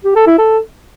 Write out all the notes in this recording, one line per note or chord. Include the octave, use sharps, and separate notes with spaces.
G4
A4
E4
A4